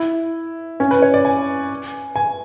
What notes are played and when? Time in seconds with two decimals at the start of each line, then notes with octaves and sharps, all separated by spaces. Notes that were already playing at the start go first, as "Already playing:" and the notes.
Already playing: E4
0.80 C#4
0.91 B4
1.02 C#5
1.14 D5
1.25 G#5
2.16 G#5